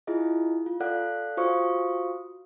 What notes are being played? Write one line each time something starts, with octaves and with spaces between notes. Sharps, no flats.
E4 F4 G#4 D#5
F4
A4 D5 F5 F#5 F#6
F4 F#4 C5 F5 C#6 D#6